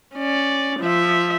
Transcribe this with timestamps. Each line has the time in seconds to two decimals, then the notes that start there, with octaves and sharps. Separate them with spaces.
0.15 C#4 D5
0.80 F3 E5